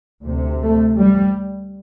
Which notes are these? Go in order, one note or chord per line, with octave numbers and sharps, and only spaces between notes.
D2 C3
A3
G3